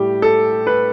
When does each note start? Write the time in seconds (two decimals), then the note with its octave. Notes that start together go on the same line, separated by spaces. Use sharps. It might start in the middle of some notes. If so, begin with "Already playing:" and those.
Already playing: A2 G3 G4
0.22 A4
0.67 B4